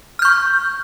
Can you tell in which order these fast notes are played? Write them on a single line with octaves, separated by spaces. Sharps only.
F6 G6 C#6